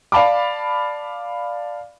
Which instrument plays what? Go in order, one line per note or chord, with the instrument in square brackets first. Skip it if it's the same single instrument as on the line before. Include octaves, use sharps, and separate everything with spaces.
[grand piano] D5 F5 A5 B5 D6